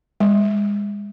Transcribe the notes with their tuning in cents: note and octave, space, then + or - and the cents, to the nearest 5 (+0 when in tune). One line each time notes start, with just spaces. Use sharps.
G#3 -30